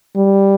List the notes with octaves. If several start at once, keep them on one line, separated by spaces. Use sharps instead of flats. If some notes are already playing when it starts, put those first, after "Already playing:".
G3